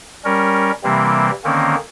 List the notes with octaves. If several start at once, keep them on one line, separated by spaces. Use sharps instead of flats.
G3 C#4 A#4
C3 E3 G3 A#3 C4
D3 D#3 A#3 C4 C#4